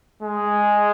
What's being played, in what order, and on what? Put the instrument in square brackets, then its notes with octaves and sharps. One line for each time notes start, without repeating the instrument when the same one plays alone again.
[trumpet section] G#3